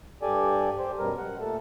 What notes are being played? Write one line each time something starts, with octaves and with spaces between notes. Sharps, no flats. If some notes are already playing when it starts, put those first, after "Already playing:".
G2 G4 A4 D5 G#5
G4 C5
F#2 B2 G3 A#4
F#5
A#2 A3 A4